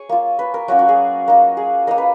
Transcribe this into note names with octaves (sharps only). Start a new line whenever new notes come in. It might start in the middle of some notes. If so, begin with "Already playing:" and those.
Already playing: G#4 C#5
A#3 F4
B4
A#4
F#3 A#3 C#4 F4 F#4
F#4
G#4
A#3 D#4
G#4
A#3 D#4 A#4
B4